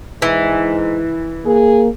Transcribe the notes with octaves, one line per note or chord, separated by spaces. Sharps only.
G#2 E3
A#3 G#4